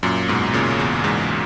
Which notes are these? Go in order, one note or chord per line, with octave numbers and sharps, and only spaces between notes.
F#2 A#2
G#2 B2
A#2 C#3
E2
E2 G#2